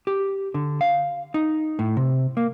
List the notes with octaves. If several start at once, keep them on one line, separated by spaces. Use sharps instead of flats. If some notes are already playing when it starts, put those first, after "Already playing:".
G4
D3
F5
D#4
A2
C3
A#3